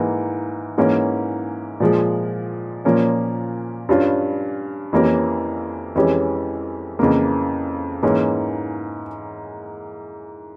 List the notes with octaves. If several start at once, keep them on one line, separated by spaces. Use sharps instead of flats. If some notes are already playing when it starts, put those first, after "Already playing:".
Already playing: G#2 E3 A#3
G#2 E3 A#3 C#4
A#2 F3 G#3
A#2 F3 A#3 C#4
G2 G3 C#4 F4
F2 E3 A#3 C#4 G4
F2 E3 G#3 C#4 G4
F2 C#3 E3 A#3
G#2 E3 A#3 C#4